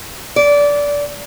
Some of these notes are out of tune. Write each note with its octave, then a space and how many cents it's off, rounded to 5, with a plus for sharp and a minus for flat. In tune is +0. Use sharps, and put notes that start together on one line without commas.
D5 -20